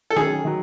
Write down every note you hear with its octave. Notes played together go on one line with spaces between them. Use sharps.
A4
D#3 F#3 C#4 G#4
D#3 F#3